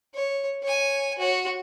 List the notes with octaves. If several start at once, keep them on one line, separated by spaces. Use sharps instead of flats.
C#5
C#5 G#5
F#4 C#5